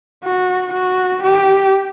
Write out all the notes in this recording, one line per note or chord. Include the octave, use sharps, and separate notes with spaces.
F#4
F#4
G4